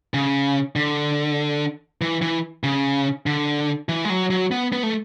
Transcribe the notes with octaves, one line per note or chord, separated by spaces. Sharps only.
C#3
D3
E3
E3
C#3
D3
E3
G#3
F#3
F#3
B3
B3
A3